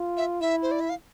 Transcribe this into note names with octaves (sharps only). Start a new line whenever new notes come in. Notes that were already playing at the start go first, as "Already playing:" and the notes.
Already playing: F4
E5
E4 E5
C5
D5
E5
F5